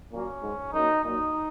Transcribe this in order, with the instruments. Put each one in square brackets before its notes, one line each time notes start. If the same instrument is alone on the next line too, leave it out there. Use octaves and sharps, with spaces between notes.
[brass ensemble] A#2 F#3 A#3 C#4
G#2 G#3
F#2 F#3 A#3 D#4
A#2 F#3 A#3 D#4